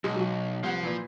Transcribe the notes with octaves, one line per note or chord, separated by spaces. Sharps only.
B1 G#3
F#3 F#4
C2 F3 F#5
A#2 E3